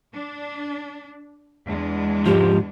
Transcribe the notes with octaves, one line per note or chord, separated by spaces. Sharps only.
D4
E2 G#3 D4
G#2 F3 G4